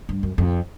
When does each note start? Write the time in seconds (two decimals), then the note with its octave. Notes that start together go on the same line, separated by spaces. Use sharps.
0.09 G2
0.23 F#2
0.38 F2